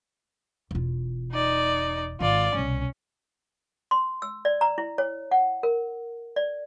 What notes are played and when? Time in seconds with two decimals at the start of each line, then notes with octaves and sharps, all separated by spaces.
0.71 E1 F4
1.32 D#4 D5
2.20 G#1 D#3 F4 D5
2.55 C2 B2 C#4
3.91 C6
4.22 E6
4.45 D5
4.61 A#5
4.78 E4
4.98 C#5
5.31 F#5
5.63 A#4
6.36 D5